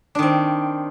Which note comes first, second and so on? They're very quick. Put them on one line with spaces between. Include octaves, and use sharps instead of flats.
D4 D#3 C4